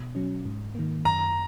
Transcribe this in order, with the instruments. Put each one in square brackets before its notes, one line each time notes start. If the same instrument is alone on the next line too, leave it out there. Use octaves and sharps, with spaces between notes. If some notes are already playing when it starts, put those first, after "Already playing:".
Already playing: [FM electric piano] B2
F#3 C#4
G#2
D#3 A#3
[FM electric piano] F#2 [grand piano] A#5